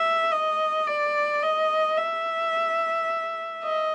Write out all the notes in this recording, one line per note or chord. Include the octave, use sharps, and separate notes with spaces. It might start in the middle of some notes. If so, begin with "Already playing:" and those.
Already playing: E5
D#5
D5
D#5
E5
D#5